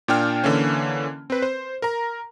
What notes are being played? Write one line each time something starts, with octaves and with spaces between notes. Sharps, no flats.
A#2 D4 G5 F6
D3 E3 A#3 C#4
C4 B4
C5
A#4 A#5